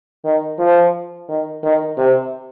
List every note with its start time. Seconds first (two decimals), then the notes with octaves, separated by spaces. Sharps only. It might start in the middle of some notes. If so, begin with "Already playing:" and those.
0.24 D#3
0.59 F3
1.29 D#3
1.63 D#3
1.98 C3